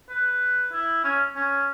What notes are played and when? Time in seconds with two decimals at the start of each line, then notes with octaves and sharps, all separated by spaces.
0.09 B4
0.72 E4
1.04 C#4
1.36 C#4